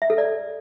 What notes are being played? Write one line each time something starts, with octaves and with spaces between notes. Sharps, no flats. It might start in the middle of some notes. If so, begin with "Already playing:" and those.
E5
A4
D5